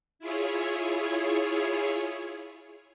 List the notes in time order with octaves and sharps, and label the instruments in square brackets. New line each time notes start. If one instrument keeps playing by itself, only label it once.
[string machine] E4 F4 G#4 C#5